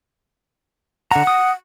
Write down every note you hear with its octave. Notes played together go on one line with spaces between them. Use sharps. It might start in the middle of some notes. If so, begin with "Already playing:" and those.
D3 F#5 A#5
D#6